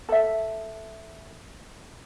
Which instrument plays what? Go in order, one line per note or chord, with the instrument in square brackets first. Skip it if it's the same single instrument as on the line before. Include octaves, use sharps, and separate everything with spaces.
[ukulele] A4 E5